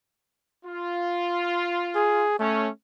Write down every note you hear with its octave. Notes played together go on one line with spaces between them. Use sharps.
F4
G#4
A3 C#4